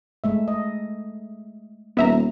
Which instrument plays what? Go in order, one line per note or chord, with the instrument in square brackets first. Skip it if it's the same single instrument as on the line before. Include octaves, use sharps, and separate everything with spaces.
[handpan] G#3 A3 E5
D#5
[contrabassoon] D#1 [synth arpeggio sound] B3 E5 A#5